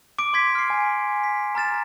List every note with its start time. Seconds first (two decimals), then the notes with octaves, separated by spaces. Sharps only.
0.19 D6 D7
0.33 C6 G#6 B6
0.55 F6 C7
0.70 G#5
1.24 B6
1.55 A#5 F6 A6 E7